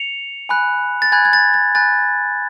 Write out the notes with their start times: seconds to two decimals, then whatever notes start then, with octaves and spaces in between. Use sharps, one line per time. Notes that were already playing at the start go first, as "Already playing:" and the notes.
Already playing: C#7 F7
0.49 G#5 B5 F#6
1.02 A6
1.12 G#5 B5 F#6 G#6
1.25 G#6
1.33 A6
1.54 A6
1.75 G#5 B5 F#6 A6